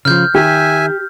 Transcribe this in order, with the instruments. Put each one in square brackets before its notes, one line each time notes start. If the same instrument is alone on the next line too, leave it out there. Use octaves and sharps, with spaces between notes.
[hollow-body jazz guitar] C#3 E3 F3 [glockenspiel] F6 G6
[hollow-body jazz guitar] D#3 [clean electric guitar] G4 [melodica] E5 G#5